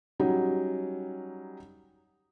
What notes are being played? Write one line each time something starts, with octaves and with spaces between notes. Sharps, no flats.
F#3 G3 C#4 D#4